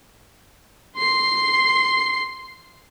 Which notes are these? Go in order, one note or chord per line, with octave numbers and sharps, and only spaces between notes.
C6 C7